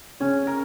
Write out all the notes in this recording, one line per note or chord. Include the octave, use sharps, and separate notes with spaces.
C#3 C#4
A#4